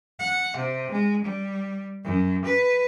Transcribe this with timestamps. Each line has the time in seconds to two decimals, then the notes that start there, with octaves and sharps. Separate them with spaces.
0.20 F#5
0.57 C3
0.91 G#3
1.23 G3
2.04 F#2
2.44 B4